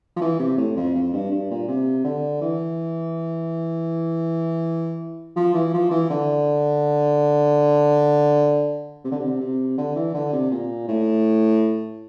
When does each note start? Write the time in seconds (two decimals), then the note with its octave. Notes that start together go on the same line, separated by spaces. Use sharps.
0.16 F3
0.21 E3
0.39 C3
0.57 A2
0.76 F2
0.95 F2
1.13 G2
1.31 G2
1.50 A#2
1.68 C3
2.04 D3
2.41 E3
5.36 F3
5.54 E3
5.73 F3
5.91 E3
6.10 D3
9.04 C3
9.11 D3
9.19 C3
9.40 C3
9.78 D3
9.96 E3
10.14 D3
10.33 C3
10.51 A#2
10.88 A2